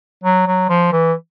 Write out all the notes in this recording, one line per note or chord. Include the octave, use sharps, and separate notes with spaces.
F#3
F#3
F3
E3